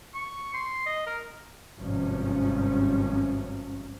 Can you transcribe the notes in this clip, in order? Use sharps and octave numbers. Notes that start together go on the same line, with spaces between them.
C#6
C6
D#5
A#4
G#1 G2 C3 F3 C#4